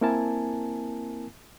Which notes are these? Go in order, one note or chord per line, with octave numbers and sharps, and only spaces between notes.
A#3 C4 E4 A#4 G#5 A5